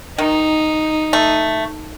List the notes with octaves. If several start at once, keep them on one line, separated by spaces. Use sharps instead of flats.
D#3 D#4
A3